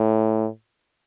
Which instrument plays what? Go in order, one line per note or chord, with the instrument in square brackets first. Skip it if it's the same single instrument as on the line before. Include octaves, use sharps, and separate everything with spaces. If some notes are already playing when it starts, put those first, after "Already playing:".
Already playing: [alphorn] A2